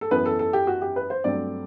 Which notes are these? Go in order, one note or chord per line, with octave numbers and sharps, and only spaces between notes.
A4
F#2 E3 B3 B4
A4
A4
G4
F#4
G4
B4
C5
G2 F#3 A3 C4 D5